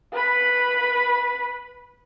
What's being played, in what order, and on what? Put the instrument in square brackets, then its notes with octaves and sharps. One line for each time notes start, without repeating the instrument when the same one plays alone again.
[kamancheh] B4 B5